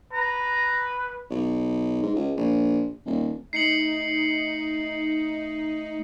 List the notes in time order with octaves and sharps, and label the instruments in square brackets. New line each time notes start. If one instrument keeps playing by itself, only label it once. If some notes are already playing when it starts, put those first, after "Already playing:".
[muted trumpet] B4 [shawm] A#5
[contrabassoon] B1
G#2
C#2
A#1
D#1
[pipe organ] A3 [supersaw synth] D#4 [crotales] C7 C#7 F#7